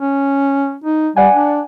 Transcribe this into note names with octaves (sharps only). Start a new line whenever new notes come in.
C#4
D#4
G3 D5 F#5 G#5
D4